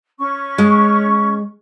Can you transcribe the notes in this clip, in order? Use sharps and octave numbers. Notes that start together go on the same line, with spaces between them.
C#4 C#6
G#3